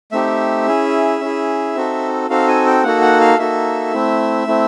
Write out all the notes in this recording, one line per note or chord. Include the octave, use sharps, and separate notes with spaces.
A3 C4 D#4 G4 E5
C#4 E4 G#4
C#4 E4 G#4
C4 D#4 F#4 A4
C4 D#4 F#4 A4 F5
G#5
G5
A#3 D#4 F#4 A4 F#5
F#5
F5
A#3 D#4 F#4 A4 E5
A3 C4 E4
A3 C4 E4